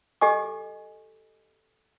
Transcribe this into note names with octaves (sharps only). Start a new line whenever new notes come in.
G4 A4 D#5 G#5 D6